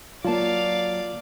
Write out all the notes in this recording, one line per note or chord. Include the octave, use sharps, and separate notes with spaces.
F#3 A#3 F4 D5 F5 A5